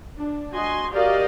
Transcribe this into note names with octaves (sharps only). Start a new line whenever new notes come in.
D4
F#4 D#5 G#5 C6
F#4 G4 A#4 D5 D#5 F5